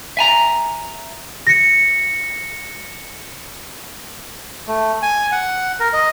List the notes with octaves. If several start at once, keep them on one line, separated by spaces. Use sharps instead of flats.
E5 G#5 A#5
A#6 C#7
A3
G#5
F#5
A#4
D#5